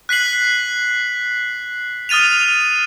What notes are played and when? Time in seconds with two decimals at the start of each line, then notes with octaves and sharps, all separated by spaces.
0.09 F#6 B6 C7 F#7
2.09 D#6 F6 A6 D#7 F7